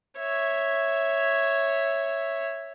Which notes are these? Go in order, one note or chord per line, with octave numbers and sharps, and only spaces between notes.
C#5 E5